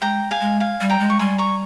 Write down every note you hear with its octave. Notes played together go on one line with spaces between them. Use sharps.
G#3 G5 A#5
F5 G#5
G#3
F5 G#5
G3
G5 A#5
G#3
C#6
G3 G#5 C6
A#5 C#6